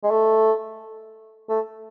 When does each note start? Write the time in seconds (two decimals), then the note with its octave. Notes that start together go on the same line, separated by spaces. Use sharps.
0.03 G#3
0.11 A3
1.49 A3